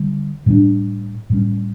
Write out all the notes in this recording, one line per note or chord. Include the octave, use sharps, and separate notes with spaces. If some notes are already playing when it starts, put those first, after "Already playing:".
Already playing: D3 G3
A2 G3 B3 D4
A2 G3 C#4